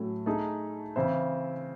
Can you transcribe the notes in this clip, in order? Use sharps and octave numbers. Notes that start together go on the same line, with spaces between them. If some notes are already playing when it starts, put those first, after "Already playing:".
Already playing: A2 F#3 A3 C#4
A3 D#4 G#4
C#3 E3 C4 E4 C5